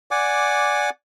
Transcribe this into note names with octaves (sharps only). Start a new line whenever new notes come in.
D5 F#5 G#5 D6